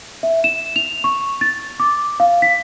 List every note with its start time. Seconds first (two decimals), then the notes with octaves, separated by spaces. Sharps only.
0.23 E5
0.44 E7
0.76 F7
1.04 C#6
1.41 A6
1.80 D6
2.20 F5
2.42 B6